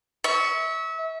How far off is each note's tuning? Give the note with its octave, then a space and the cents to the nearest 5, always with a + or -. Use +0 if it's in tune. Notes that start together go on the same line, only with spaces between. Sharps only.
E5 -30 C#6 +10